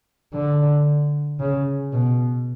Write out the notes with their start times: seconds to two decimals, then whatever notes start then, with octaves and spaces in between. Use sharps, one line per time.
0.34 D3
1.40 C#3
1.93 B2